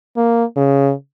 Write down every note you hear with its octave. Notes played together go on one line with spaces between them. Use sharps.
A#3
C#3